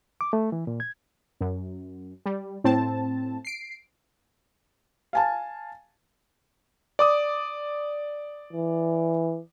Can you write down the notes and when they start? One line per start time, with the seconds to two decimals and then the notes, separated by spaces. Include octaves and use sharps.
0.21 D6
0.33 A3
0.52 E3
0.67 A#2
0.80 G#6
1.41 F#2
2.26 G3
2.64 A2 C4 A5
3.45 C7 D7
5.13 F5 G#5 A5
6.99 D5 D6 D#6
8.53 E3